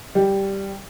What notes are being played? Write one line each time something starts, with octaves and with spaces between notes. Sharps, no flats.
G3